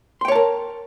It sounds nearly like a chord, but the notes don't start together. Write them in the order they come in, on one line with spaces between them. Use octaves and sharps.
C6 G5 C#5 A5 A#4